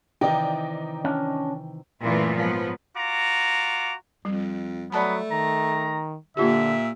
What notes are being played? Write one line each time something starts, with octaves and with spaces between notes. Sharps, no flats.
C3 D#3 E3 D#4 D5 D#5 G5
C#4 D4
F#2 A#2 E3 A3 B3 F4
G#2 F3 F#3 B3
F4 F#4 A#5 D6
F2 G3
F#3 A3 B3 D5 A5 B5
D#3 A#5
A#2 D3 A#3 F4 G4 E5